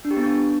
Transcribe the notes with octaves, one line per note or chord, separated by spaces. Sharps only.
D4
G4
B3
D4